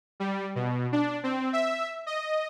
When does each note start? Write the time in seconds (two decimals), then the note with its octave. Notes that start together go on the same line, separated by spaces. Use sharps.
0.20 G3
0.55 B2
0.92 D4
1.23 C4
1.53 E5
2.06 D#5